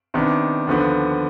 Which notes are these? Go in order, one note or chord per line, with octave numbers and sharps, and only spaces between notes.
C3 D#3 B3 D4
D#2 D3 F3 B3